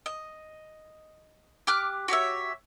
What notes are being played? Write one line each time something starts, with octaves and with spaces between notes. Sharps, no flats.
D#5
G4 D6 F6 F#6
F#4 G4 C#5 E5